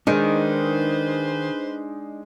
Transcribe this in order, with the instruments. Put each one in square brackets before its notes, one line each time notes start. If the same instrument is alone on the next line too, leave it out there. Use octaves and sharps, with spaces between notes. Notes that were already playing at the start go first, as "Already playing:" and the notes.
[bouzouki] D#3 [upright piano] G#3 [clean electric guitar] D4 D#4 [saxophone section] B4 C5